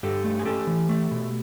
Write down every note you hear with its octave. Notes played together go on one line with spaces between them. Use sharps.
G2 G4 A4
A3
G#4
C#4 G4 A4
E3
A3
B2